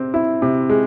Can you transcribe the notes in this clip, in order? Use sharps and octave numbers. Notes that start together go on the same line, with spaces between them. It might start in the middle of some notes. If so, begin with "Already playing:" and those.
Already playing: C3 C4
E4
C3
G#3